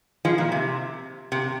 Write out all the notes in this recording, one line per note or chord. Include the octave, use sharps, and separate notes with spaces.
F3 G#3
A#2
C3
C3